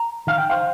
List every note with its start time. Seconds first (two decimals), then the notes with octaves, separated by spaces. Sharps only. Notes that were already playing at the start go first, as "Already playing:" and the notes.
Already playing: A#5
0.27 D#3 F5
0.38 G5
0.50 C5 F5